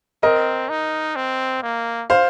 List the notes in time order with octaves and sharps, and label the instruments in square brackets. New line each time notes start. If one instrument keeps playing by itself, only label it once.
[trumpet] C4 [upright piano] A#4 D#5
[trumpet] D#4
C4
A#3
[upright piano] C5 F5